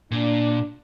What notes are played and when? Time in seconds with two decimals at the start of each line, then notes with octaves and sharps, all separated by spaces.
0.11 A#2 D4